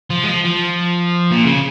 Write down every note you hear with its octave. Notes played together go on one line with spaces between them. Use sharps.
F3
G#3
F3
F3
A#2
C#3